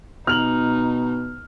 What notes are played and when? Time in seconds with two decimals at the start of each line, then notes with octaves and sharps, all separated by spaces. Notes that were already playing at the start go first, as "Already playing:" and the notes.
0.27 B2 D#4 F6 F7 F#7